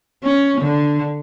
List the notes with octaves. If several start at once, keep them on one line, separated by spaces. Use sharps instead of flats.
C#4
D3